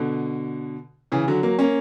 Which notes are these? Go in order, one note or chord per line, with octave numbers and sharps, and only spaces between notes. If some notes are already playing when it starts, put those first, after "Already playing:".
Already playing: B2 D3
C#3 E3
D3 F#3
F#3 A#3
A#3 C#4